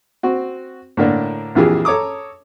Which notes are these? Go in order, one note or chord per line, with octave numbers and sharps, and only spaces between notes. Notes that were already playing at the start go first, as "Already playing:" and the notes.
C4 F#4
A2 D3 A#3 D4
A#1 F2 E3 F4 G4 G#4
A4 C#5 A#5 D6 D#6